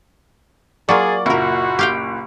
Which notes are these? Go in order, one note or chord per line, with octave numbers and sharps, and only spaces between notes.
F#3 A#3 F4 G#4 D5 C#6
F#1 A#2 E4 F#4 A#4
G4 F5 G5